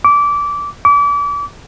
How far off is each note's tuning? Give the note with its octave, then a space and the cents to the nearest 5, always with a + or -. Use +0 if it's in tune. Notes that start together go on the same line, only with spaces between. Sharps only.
D6 -20
D6 -35